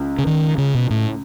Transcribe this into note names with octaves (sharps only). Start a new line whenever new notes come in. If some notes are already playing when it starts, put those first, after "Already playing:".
Already playing: C#2
C#3
D#3
C#3
B2
A2